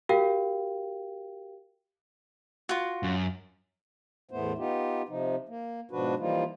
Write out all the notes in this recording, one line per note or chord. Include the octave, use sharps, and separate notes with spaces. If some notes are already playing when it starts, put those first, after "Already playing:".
F#4 G4 A#4 F5 G5
F4 F#4
F#2
E2 A2 A3 B3 C5
B3 D#4 F4 G4
C3 F3 D#4
A#3
G#2 B2 F3 D4 F#4 B4
E3 F3 G3 A#3 D#4 F4